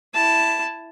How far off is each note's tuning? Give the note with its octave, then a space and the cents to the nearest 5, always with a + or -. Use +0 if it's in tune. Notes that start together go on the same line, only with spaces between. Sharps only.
E4 +5 A5 +0